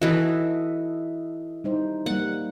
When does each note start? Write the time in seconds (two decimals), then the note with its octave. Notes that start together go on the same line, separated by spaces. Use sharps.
0.02 E3 F#4 A4 D#5 E5
1.64 G3 D#4 C5
2.06 G3 A#3 F#5